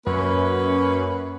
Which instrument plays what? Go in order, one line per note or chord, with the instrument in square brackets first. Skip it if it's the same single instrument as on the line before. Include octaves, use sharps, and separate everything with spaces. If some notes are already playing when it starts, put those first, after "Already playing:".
[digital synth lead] F#2 [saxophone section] A#3 C#4 B4